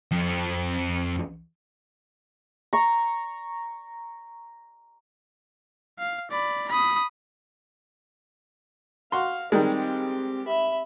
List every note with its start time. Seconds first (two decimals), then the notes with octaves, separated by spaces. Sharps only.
0.12 F2
2.73 A#5 C#6
5.99 F5
6.31 D5 B5
6.69 B5 D#6
9.12 F#4 F5 C6
9.52 D#3 G3 G#3 C4 G4
10.47 E5 B5